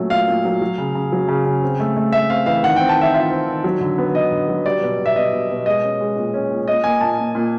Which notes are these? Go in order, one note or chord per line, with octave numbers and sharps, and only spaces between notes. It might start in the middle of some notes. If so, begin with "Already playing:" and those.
Already playing: A#2 F#3 A3 C#4
A#2 F5
A#2
F#3
F#3
C#3
C#3
F#3
C#3
C#3
C4
A3
A3
A3 E5
C4 F5
E3 F5
D#3 F#5
C4 G5
A5
D#3 E5
F4 E5
C4
D#3
F#3
D3
B3
D3 D#5
D3
F#3
G3 D5
B2
B2
E5
B2 D#5
B2
B2
G#3 D#5
C#4
G#3
A#2
C#4
A#2
A#2 D#5
A#3 G#5
A#2 A5
A#2
A#2